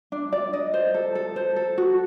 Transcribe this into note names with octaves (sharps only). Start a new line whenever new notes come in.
D4
D5
D#5
C5
A4
A4
C5
A4
F#4